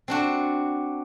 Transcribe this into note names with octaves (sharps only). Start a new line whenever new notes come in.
C4 D4 F#4